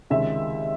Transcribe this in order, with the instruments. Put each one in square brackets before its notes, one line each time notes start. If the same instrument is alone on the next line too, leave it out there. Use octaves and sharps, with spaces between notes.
[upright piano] C#2 C3 D#3 G#3 C#4 E5